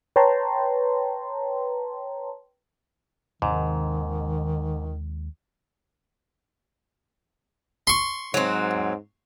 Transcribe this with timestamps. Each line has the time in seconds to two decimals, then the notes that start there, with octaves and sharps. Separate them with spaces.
0.16 B4 C#5 G5 A5 A#5 C6
3.42 D#2 G#2 C3 D#3 G#3
7.87 C6 C#6
8.34 G#2 F#3 C4